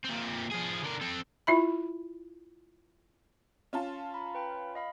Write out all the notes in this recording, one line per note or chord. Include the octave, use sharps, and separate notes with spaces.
A#2 C4
F3 G#4
D3 A#4
C4 A4
E4 F4 E5 B5
C#4 F4 A5
A#5 B5
B4 G5 B5
D#5 F5 B5